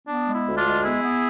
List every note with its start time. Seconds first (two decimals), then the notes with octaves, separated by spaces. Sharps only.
0.07 B3 D4
0.26 G#3
0.33 E4
0.45 D2
0.57 D4 F4
0.65 G#3
0.83 B3 E4 G#4
1.03 B3